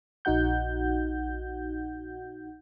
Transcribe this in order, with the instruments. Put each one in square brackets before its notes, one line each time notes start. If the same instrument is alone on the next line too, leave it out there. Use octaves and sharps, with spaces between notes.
[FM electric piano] A#1 D#4 F#4 F#5 G6